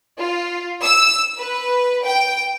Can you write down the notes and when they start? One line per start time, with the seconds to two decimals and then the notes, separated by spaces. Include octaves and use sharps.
0.19 F4
0.81 E6
1.38 B4
2.05 G5